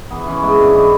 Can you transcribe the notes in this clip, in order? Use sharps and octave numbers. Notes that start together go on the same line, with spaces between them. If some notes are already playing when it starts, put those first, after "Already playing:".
E3 B3
E3 C#4
G#2 E4
G#2 D4
E3 E4